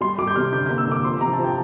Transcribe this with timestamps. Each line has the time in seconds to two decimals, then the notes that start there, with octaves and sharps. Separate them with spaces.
0.01 G3 C6
0.18 G3 D6
0.27 G6
0.36 C3 F6
0.52 D3 G6
0.66 A#3 G6
0.78 E6
0.87 D3 D6
1.05 F3 C6
1.21 C3 A#5
1.33 A5
1.39 F3
1.44 G5